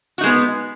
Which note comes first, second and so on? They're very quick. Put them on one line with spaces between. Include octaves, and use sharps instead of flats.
F#4 D#4 G#3 B3